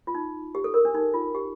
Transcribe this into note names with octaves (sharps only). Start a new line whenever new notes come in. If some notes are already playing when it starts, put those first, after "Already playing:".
F4
D#4
G4
A4
A#4
D4
D#4
F4
G4